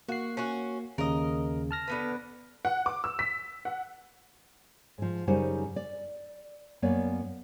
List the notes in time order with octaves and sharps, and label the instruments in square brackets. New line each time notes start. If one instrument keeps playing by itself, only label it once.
[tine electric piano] A#3 C7 [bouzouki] F#4
[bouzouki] C#4 F#4
[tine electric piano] D#2 C#3 [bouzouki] A#4 D#5
[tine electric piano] A5 F6 A#6
[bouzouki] D3 B3 B4
[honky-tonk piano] F#5
D6
E6
B6
F#5
[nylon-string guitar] G#2 F3
F#2 C#3 G3 D#4 C5 F#5
D5
F#2 A#3 B3 C#5 D5